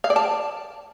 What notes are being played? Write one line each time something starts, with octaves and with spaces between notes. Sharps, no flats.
F5
D5
A5